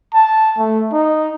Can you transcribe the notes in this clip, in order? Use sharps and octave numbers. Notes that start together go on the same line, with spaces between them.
A5
A3
D#4